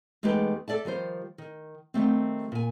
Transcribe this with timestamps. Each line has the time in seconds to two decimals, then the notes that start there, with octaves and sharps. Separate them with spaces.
0.23 E2 G#3 A3 D#4 G4 B4
0.68 A4 D5 E5 A5
0.85 D#3 F3 G3 C5
1.38 D#3
1.94 D#3 G3 A3 C4
2.52 A#2 G#5